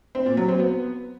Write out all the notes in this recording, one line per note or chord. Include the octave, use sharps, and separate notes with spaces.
C4
A#2
F#3
C4
B3